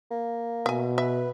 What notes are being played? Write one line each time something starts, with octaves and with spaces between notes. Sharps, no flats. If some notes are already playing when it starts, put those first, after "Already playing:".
A#3
B2 E5 G#5
B4 E5